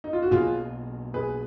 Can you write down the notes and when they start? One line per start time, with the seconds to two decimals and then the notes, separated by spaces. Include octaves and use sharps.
0.04 D#4
0.13 F4
0.22 F#4
0.31 B1 B2 A#3 F4 G#4
1.14 G#4 B4